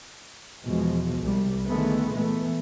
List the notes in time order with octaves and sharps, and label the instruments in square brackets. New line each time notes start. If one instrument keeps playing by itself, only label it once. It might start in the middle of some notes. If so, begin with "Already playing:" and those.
[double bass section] E2 B2 F3 G#3
C2 G3
D3 D#3 G#3 A3 B3
A#2 E3 A3 B3